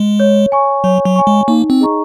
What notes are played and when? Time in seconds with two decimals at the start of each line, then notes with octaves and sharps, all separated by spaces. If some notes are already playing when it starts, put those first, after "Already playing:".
Already playing: G#3
0.20 C#5
0.52 G#5 C#6
0.84 F#3 C#5
1.05 F#3
1.16 G#5 C#6
1.27 G#3
1.48 A#3 D#4
1.70 C4
1.81 G#4 D#5 A#5 C#6